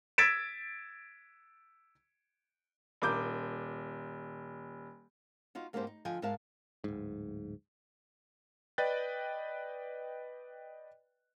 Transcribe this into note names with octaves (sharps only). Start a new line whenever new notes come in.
E6 G#6 A6 B6 D7 E7
D#1 A#4 D6 G6
D#4 F4 F#4
G#2 A#3 B3 D4 G4 C5
D#4
D3 F3 D#5 G5 G#5
G#2 A#4 E5 F5 A5
D1 G#2
B4 D5 D#5 G5 F#6 A6